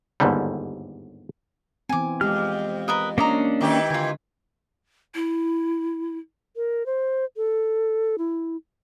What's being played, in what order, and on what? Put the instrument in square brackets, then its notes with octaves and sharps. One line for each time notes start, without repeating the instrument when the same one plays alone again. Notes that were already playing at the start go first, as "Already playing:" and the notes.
[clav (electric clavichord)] G1 D#2 G#2 D3 G3
[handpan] E3 B3 C4 [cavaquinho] G#5 D6
[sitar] F2 [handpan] G#3 G4 [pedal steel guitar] F6
[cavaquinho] A#4 B4 D#5
[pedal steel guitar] A#3 C#4 D4 [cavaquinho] D5 D#5 A#5
[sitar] D#3 E3 G4
[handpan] D3 [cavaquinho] F4 G#5
[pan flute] E4
[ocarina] A#4
C5
A4
E4